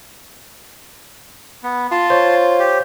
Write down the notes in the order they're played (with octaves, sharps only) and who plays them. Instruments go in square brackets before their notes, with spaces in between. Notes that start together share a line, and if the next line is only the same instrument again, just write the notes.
[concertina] B3
[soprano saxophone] F4 [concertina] A5 C6
[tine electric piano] C5 C#5
[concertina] G4